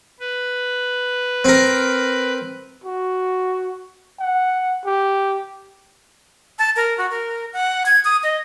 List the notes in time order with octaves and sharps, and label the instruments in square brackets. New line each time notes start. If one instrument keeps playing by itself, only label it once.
[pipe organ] B4
[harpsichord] C4 A#4
[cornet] F#4
F#5
G4
[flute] A5
A#4
F#4
A#4
F#5
G#6
D#6
D#5